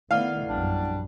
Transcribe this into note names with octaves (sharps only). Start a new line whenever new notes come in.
D#3 A3 B3 E4 D5 F5 F#5
A#1 F#2 G3 D4